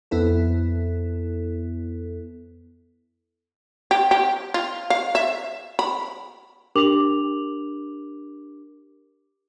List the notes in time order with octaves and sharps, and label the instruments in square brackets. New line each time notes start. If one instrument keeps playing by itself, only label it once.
[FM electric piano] F2 B3 E4 A4
[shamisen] G4
G4
F4
F5
E5
B5
[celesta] D4 G4 A#4 D6 F7 F#7